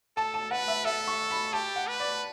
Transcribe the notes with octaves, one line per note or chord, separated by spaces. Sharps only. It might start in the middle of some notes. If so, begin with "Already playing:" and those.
A4 A5
A5
B4 F#5
E5
A4 E5
C#6
B5
G4 A5
F#5
B4
D5